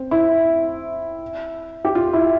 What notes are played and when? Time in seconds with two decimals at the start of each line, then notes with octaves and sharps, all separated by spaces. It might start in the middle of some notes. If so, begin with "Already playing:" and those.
Already playing: C4
0.11 E4
1.85 G4
1.95 F4
2.13 E4